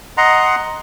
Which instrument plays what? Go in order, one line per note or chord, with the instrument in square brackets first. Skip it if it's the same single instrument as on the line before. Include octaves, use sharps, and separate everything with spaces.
[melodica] D#5 F#5 A#5 C6